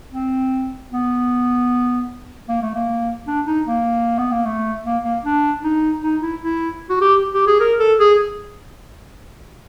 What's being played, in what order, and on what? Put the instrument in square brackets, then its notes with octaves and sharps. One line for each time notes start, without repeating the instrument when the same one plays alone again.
[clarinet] C4
B3
A#3
A3
A#3
D4
D#4
A#3
B3
A#3
A3
A#3
A#3
D4
D#4
D#4
E4
E4
F#4
G4
G4
G#4
A#4
A4
G#4